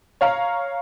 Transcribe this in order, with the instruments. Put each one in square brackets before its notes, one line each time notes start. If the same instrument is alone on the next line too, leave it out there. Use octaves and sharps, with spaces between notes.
[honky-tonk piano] C#5 F5 A#5